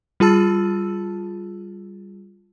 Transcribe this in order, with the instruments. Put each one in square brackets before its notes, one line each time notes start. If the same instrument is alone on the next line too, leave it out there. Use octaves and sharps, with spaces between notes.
[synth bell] G3 F4 G#4 A5 E6 A6